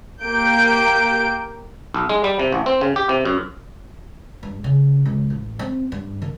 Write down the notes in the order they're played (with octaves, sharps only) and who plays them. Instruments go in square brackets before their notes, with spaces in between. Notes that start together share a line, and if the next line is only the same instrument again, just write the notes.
[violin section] A#3 G4 G6 D7
[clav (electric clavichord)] B1
G#3
G3
C3
A1
C4
C#3
G4
C3
F#2
[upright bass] G2
C#3
C#2
A1
C4
G2
D#3